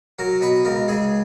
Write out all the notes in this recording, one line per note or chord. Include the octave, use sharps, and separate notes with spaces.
F#3 A#4
B2 B4
C#2 A#4
C#2 G#4